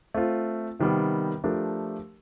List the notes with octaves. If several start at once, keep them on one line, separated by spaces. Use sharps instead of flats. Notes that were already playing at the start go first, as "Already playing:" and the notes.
A3 C4 F4
C3 D#3 G3 B3
F3 A3 D4 G4 A#4